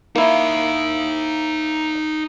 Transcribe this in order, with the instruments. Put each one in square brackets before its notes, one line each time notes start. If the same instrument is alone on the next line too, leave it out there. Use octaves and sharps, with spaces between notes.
[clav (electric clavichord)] A#3 E4 [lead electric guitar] D#4 F5